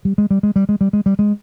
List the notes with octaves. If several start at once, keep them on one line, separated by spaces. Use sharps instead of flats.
G3
G#3
G3
G#3
G3
G#3
G3
G#3
G3
G#3